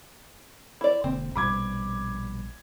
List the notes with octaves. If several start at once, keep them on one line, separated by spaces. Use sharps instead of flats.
E4 D5
E1 D3 A#3 C4
A#1 B2 G3 B5 D6 G#6